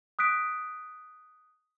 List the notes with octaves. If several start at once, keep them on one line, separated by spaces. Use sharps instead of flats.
D#6 F#6 B6 D7